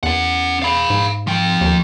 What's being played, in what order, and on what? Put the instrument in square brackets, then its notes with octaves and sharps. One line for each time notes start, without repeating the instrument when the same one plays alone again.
[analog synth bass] E2 [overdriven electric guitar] C#4 F#5
[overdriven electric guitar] F5 B5
[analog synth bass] G#2
[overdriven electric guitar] F3 G5
[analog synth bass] D#2